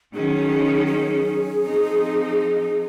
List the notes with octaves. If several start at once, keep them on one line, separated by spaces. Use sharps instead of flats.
D#3 F#3 C#4 G#4
G#4
F3 C4 D#4